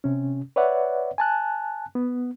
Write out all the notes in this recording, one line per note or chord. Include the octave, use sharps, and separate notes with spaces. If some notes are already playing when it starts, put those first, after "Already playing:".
C3 C#4
B4 C#5 D5 E5 F#5
G#5 A5 F#6
B3